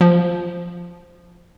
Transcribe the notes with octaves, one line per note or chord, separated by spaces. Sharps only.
F3